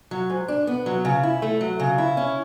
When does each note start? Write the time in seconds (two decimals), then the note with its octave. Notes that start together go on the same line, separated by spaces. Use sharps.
0.11 F#3
0.30 G#2
0.48 D4
0.67 B3
0.86 F#3
1.05 C#3
1.23 E4
1.42 A3
1.61 F#3
1.80 C#3
1.98 E4
2.17 C#4